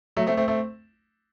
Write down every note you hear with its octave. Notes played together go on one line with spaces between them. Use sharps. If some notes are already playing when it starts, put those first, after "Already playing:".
F#3 A3
A3 C4
A3 C4
A3 C4